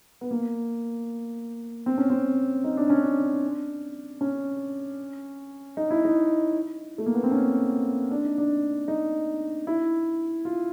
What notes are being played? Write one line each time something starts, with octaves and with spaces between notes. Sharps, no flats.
B3
A#3
C4
C#4
C4
D#4
D4
C#4
D4
C#4
D#4
E4
D#4
A3
A#3
B3
C4
C#4
D4
D#4
D4
D#4
E4
F4